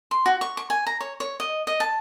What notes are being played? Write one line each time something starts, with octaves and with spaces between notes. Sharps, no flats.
C6
F#4
C#6
C#6
G#5
A#5
C#5
C#5
D#5
D#5
A5